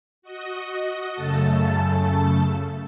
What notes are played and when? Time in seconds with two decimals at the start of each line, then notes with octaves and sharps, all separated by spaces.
0.22 F#4 D#5
1.14 F#2 C#3 A3 A4 A5